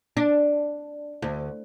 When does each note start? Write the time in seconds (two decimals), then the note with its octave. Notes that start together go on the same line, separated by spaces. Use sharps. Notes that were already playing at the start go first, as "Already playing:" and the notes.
0.17 D4
1.22 D2